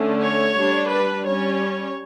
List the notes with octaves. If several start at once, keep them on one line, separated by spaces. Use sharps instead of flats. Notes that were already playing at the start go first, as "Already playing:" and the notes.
Already playing: D3 A3 C#4
C#5
G3 D4
B4
G3 C#4 C#5